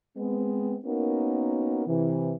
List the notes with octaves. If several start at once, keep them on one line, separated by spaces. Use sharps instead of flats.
G#3 B3 C4
A#3 B3 C#4 D#4 F#4 A#4
C3 E3